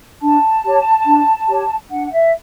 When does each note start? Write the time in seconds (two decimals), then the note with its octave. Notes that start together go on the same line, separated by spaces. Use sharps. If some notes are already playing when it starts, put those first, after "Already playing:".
0.20 D4 A5
0.63 G4 C#5
1.05 D4
1.48 G4 C#5
1.90 D4 F#5
2.05 F#5
2.12 E5